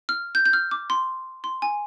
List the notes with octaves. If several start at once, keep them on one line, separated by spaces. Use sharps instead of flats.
F6
G6
G6
F6
D6
C6
C6
G#5